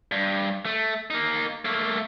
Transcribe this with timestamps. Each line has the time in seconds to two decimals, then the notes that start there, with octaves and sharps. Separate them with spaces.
0.12 G2
0.65 A3
1.10 A#3 D#4
1.65 A3 A#3